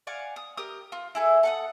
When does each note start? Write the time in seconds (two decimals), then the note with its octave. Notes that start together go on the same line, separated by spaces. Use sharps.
0.07 D5 F5 F#5 G#5
0.36 D#6
0.57 G4 A#4 D#6
0.92 F4
1.15 E4 G#4 A4
1.43 A4 F#5 D#6